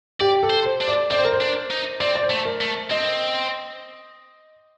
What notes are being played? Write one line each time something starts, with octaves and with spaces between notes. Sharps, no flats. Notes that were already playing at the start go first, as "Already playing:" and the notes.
G4 D5
A4
C5
C5
D4
D5
C4 D5
C5
A#4
C5
D4
D#4
C4 D5
D5
C5
A3
A#4
A3
C4 D#5